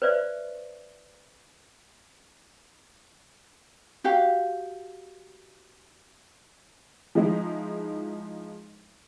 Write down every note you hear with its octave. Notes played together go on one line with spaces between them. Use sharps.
B4 C5 D5 E5
F#4 G4 F5
F3 G#3 D#4 E4